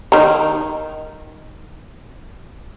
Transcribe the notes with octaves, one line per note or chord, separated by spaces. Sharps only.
D#3 A#5